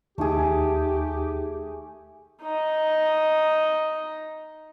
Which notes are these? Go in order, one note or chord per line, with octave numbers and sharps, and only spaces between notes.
D#2 A3 D#4 G4 G#4
D#4 D#5